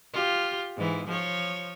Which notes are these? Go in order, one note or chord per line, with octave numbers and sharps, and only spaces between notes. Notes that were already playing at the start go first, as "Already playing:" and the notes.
F4 G4
G#2 E3
F3 C#5